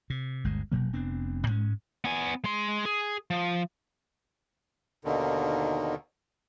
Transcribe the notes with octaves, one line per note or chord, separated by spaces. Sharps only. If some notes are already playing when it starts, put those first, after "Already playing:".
C3
G1 D2 G#3
F1 B2 F#3 A#3
F1 B3 C4 D4
G#2 G#3 C#4
B3 G#5
G#3 C6
G#4
F3
D#2 B2 D3 D#3